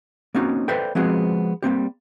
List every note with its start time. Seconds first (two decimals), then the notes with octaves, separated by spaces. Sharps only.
0.34 A#3 C4 C#4 D#4 F#4
0.68 A4 B4 C5 D5 E5 G5
0.95 F3 G#3 B3 C4 F#4 G#4
1.62 G3 A#3 C4 G4